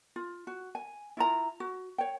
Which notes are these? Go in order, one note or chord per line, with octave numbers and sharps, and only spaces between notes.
F4
F#4
G#5
E4 F4 A#5
F#4
C#5 G5